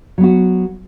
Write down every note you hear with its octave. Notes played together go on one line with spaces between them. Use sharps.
F#3 B3 F#4